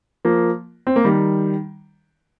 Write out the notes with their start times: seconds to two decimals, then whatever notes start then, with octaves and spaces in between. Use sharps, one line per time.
0.25 F3 A#3
0.87 C4
0.96 A#3
1.05 D#3 G3